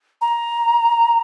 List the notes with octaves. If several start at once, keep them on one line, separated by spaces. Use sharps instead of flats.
A#5